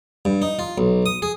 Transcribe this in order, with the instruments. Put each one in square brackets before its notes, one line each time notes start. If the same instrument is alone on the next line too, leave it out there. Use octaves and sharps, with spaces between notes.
[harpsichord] G2
D#4
F4
B1
D#6
G#4